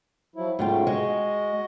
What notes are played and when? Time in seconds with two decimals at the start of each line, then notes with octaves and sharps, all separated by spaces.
0.36 F3 F#3 E4
0.59 G#2 C#3 F#3 A3 F4 G5
0.87 G#3 F#4 D#5